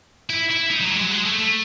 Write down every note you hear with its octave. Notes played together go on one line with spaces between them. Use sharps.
E4
E4
D#4
F#3
E3
G#3
F#3
G#3
A3
A3